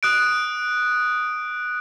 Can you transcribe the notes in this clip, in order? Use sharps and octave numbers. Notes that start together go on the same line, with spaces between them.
D#6 F#6 D7